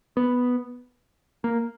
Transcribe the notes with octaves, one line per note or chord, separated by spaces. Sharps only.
B3
A#3